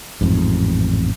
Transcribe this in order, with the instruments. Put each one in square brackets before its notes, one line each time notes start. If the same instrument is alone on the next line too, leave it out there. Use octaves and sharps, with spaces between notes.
[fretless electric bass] A1 F2 G#2